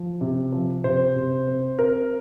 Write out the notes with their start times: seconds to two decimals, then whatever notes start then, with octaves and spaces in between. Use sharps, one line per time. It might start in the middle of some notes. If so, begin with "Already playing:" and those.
Already playing: F3
0.21 C3
0.52 F3
0.84 C3 C5
1.16 C3
1.47 C4
1.78 C4 A#4